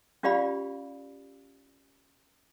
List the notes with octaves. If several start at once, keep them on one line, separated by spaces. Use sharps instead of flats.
C#4 F4 G4 D5 F5 B5